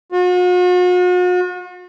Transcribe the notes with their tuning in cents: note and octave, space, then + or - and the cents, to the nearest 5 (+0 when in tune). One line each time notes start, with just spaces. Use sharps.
F#4 -45